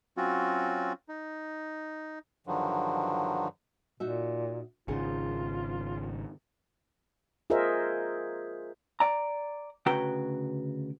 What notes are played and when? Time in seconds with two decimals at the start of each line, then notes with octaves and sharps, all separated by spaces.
0.17 F#3 C4 C#4 F4 F#4
1.08 D#4
2.47 G2 D3 D#3 F3 F#3
4.00 A#2 D#4 F#4 E5
4.88 G#1 C#3 D#4 F4 G#4 F#5
7.50 F4 G#4 A#4 C5 D#5 E5
9.00 D5 A#5
9.86 D2 C#3 F#4 B4 G5 A#5